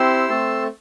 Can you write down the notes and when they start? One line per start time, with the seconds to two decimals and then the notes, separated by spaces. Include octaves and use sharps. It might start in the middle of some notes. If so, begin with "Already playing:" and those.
Already playing: C4 E4 G4 C6 E6
0.29 A3 C4 A4